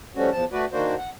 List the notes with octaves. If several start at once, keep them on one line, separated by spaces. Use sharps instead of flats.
F3 G3 A3 C#4 F#4
E2 F3 A5
A3 F#4 B4 D5
D#3 A#3 D4 F#4 C5
F#5